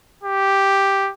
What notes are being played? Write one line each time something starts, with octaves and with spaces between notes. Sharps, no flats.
G4